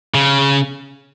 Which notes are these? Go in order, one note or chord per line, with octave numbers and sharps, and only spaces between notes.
C#3